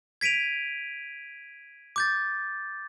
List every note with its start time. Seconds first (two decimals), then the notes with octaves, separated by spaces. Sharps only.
0.21 G#6 B6 D7 D#7 F7
1.96 D6 G6 A6